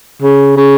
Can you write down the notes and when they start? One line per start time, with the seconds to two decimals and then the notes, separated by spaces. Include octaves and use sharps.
0.22 C#3
0.57 C#3